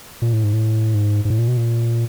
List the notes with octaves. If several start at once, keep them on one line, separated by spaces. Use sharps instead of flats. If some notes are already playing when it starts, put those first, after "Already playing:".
A#2
A2
G#2
A2
G#2
G#2
A2
A#2
B2
A#2